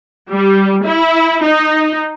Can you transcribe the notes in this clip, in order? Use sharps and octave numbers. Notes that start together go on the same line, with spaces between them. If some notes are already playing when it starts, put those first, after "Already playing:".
G3
E4
D#4